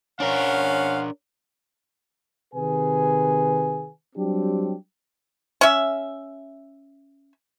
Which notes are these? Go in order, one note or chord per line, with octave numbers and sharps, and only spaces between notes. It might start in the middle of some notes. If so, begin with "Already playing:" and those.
C#4 D4 A#4 C5 F5 F#5
C3 D#3 G#4 B4 G#5
F#3 G3 C4 D4 G4
C#4 E5